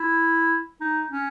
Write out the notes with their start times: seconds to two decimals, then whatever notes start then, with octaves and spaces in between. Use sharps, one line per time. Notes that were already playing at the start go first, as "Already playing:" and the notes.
Already playing: E4
0.81 D#4
1.11 C#4